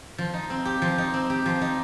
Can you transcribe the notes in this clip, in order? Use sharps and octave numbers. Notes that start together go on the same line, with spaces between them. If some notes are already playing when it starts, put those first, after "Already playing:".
F3
D#4
C4
G4
F3
D#4
C4
G4
F3
D#4